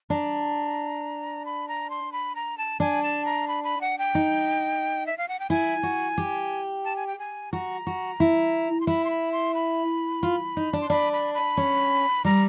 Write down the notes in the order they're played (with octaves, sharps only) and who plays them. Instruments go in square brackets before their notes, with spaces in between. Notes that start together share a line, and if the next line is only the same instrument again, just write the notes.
[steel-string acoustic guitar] D4 [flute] A#5
[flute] B5
A#5
C6
B5
A#5
A5
[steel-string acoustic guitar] D4 [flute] G#5
[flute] A5
A#5
B5
B5
F#5
G5
[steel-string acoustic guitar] D#4
[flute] E5
F5
F#5
G5
[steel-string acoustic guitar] E4 [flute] G#5
[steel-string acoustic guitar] F#4
G4
[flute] A5
G#5
G5
G#5
[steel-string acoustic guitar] F#4 [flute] A#5
[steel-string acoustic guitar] F#4
E4
[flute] C6
[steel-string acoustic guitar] E4 [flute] B5
[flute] C6
B5
C6
B5
[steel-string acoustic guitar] F4
D#4
D4
[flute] C6
[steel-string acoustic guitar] D4 [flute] B5
[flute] B5
B5
[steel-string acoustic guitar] C#4
[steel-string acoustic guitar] G3 [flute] A#5